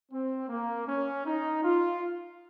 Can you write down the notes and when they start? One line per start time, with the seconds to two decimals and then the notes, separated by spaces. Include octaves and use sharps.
0.12 C4
0.49 A#3
0.87 C#4
1.25 D#4
1.64 F4